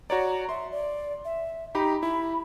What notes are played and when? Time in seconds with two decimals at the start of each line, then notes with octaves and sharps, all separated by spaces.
0.10 F#4 C#5 D5 A#5
0.49 E5 C6
0.72 D5
1.25 E5
1.75 D#4 G4 A#5 B5
2.03 E4 B5